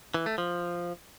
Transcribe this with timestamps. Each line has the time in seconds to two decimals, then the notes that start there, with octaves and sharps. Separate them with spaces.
0.14 E3
0.26 A3
0.38 F3